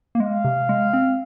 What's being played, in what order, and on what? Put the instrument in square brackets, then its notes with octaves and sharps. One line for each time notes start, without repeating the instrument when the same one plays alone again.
[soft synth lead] A#3
[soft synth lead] G#3 [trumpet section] F5
[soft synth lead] C3
G#3
C4